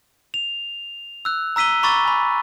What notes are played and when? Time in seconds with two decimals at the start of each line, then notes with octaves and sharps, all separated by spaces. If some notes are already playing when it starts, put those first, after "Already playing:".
0.34 F7
1.25 E6 F#6
1.56 A#5 E6 B6 D#7 G7
1.83 A#5 B5 C#6 D6 E6 A6
2.05 G#5 B5